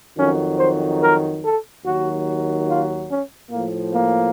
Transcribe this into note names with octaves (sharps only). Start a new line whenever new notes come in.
F2 D#3 F#3 C#4
C5
A#4
A4
D#2 D#3 F#3 F#4
F4
C#4
A2 F3 A#3
A#3